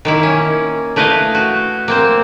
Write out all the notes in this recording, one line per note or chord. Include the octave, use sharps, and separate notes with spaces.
D#3 A#3 E4
C#4
A3 E4 B4 D#5 F5
F#4
A#3 C4 C5